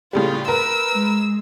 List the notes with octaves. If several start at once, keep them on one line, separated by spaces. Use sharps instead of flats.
A2 C#3 G3 F4
A#4 B4 E6
G#3